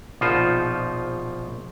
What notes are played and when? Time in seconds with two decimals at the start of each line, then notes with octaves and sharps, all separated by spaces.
0.21 A#1 B2 F3 D#4 F4 C5